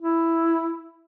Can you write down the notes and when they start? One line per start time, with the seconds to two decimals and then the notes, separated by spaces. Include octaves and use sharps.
0.01 E4